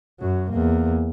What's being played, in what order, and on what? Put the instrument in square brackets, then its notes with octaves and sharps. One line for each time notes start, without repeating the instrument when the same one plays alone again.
[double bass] F#2 F#3
E2 A#3